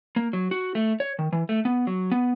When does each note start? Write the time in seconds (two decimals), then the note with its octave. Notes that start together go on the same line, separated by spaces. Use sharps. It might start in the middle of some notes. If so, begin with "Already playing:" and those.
0.16 A#3
0.33 F#3
0.51 F#4
0.75 A3
1.00 C#5
1.19 D#3
1.33 E3
1.49 A3
1.65 B3
1.87 F#3
2.11 B3